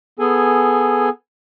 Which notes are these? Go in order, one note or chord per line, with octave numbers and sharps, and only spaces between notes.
B3 G#4 A4 G#5